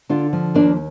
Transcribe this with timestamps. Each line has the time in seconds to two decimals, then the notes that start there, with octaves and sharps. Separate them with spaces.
0.09 D3 D4 F4
0.33 F3
0.54 D#2 A#3 D4